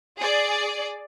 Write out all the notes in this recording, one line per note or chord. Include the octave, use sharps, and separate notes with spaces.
G#4 D5